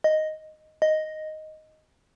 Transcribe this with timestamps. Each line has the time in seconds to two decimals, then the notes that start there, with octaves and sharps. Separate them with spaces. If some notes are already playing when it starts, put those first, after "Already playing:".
0.04 D#5
0.82 D#5